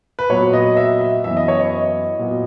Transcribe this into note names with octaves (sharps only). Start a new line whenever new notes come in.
B4
A#2 F#3 B3 C#5
D#5
E5
E5
F#2 E3 B3 E5
D#5
C#5
D#5
A#2 F#3 B3